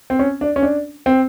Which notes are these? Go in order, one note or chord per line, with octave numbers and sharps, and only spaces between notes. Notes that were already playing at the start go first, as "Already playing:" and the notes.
C4
C#4
D4
C#4
D4
C4